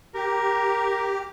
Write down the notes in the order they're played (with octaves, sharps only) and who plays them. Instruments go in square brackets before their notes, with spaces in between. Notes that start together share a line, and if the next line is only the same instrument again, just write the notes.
[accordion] G4 [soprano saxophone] A#4